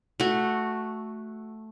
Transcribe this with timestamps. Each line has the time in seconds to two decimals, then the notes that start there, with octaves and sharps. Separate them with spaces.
0.20 A3 F#4